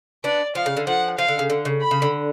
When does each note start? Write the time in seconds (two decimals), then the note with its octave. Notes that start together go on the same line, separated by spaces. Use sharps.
0.24 B3 D4 D5
0.55 F3 F5
0.66 C#3
0.77 D3
0.87 F3 F#5
1.18 F3 F5
1.28 D3
1.39 C#3
1.50 D3
1.65 C#3
1.81 B5
1.91 C#3
2.02 D3